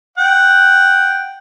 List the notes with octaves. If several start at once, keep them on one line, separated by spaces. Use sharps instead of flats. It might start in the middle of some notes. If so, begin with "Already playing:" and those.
F#5 G5